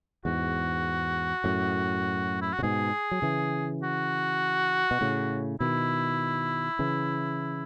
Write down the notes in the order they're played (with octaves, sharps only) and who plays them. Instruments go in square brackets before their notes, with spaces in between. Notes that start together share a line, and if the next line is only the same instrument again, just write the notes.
[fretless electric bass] E2 G#2 [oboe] F#4
[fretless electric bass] F#2 A2
[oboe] E4
F#4
[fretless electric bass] C#3
[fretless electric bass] G#2 B2 [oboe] G#4
[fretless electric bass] F#3
C#3 E3
[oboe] F#4
[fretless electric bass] B2
A2 C#3
[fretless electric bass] B2 D#3 [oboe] E4
[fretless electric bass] C#3 E3